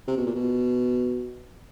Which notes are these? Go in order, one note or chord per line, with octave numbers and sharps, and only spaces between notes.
C3
B2
A#2
B2